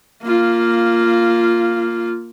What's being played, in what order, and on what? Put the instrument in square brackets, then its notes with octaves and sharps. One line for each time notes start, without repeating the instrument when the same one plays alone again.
[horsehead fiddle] A#3 F4